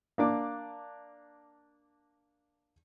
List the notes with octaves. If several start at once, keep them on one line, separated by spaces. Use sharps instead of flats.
A#3 D4 D6